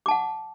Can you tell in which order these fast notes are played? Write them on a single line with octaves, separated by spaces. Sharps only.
D6 A5 F#5